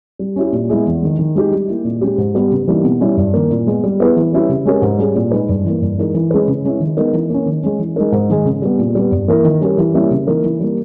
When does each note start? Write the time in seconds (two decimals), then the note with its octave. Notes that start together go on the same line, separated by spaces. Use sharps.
0.19 G3
0.36 C#4 E4 G4
0.52 A#2
0.69 G#3 B3 E4 G#4
0.86 E2
1.02 D#3 G#3
1.19 D#3
1.35 G#3 D#4 G4
1.51 G3
1.68 A#3 E4
1.84 A#2
2.01 G#3 C#4 G4
2.18 G#2
2.35 G3 B3 G4 B4
2.51 C#3
2.67 E3 G3 A#3 D#4
2.84 B2
3.01 G3 C#4 E4
3.17 G2
3.34 D#3 A#3
3.50 A#2
3.67 G#3 B3
3.84 G3
4.00 B3 E4 G#4 B4
4.16 E3
4.33 G3 C#4 E4 G4
4.49 C#3
4.65 G#3 C#4 G4 A#4
4.82 G#2
4.98 G3 C#4 G#4
5.15 A#2
5.31 G#3 D#4 G#4 B4
5.49 G2
5.65 E3
5.70 A#3
5.82 G2
5.97 E3 G#3 D#4 A#4
6.14 E3
6.31 G#3 C#4 G#4 B4
6.48 C#3
6.64 G#3 C#4 E4
6.80 D#3
6.97 G#3 B3 D#4 A#4
7.13 E3
7.30 A#3 C#4
7.46 D#3
7.63 G#3 C#4
7.79 E3
7.96 G#3 D#4 A#4
8.12 G#2
8.29 D#3 G#3
8.45 C#3
8.62 G3 B3
8.79 A#2
8.95 G3 B3
9.12 G2
9.28 E3 A#3 E4 A#4
9.44 D#3
9.61 G3 C#4 G4 A#4
9.78 E3
9.94 G3 A#3 C#4 E4
10.11 C#3
10.27 E3 A#3 D#4 A#4
10.44 E3
10.60 G3 A#3